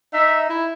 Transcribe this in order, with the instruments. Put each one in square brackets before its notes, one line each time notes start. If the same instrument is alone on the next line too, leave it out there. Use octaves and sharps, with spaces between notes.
[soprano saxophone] D#4 [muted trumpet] E5
[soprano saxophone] E4